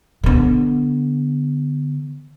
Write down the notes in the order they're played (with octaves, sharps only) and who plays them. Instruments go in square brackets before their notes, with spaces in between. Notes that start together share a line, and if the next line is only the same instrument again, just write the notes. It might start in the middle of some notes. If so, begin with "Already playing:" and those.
[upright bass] D3 B3